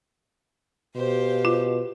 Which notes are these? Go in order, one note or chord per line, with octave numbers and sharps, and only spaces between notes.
B2 G4 C5 F5
F4